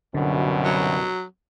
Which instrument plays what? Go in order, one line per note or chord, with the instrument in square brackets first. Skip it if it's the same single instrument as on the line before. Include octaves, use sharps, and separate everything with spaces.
[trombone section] C2 F#2 B2 [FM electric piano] D3
[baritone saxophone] F#3